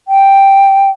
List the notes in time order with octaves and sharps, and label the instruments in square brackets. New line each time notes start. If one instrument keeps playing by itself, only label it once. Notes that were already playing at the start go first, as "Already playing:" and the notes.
[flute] G5